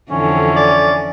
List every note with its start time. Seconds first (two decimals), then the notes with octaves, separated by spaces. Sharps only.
0.11 F2 D3 E3 C#4
0.56 D5